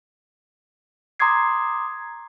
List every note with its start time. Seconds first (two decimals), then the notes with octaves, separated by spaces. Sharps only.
1.20 A#5 C6 D6 D#6 G#6 C7